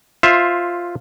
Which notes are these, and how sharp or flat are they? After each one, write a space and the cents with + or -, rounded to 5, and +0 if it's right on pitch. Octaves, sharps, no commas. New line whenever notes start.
F4 +0 C5 +20 E5 +0